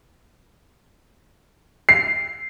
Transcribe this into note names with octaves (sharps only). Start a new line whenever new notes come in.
C7